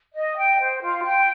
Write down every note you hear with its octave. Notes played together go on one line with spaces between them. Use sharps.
D#5
G5
C5
F4
G5